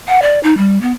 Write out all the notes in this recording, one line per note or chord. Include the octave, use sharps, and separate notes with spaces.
F#5
D5
D#4
G3
B3